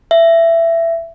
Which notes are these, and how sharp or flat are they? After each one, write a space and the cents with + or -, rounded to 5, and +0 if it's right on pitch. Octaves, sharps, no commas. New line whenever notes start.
E5 +15